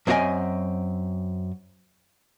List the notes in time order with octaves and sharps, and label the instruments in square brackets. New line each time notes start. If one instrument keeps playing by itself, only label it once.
[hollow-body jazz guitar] F#2 C4 E4 F4 D#5 G#5